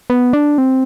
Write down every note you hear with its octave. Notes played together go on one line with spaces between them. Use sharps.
B3
D4
C4